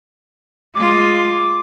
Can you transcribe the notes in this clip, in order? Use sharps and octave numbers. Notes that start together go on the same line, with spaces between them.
G#3 F4 D6